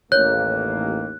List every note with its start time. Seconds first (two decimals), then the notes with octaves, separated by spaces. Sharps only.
0.12 A1 D#2 A#3 C#5 F#6